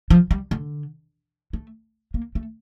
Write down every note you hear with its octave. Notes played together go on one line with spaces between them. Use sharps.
F3
G3
D3
A3
A#3
A3